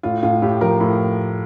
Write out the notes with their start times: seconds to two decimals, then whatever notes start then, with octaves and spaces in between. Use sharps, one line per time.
0.03 A2 F4
0.23 A2 F4
0.42 A2 G4
0.61 F3 A#4
0.80 A2